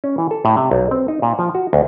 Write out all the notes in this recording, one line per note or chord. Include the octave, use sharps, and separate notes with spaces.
C#4
E3
A4
A2
C3
B1
C4
D#4
A#2
F3
F#4
D2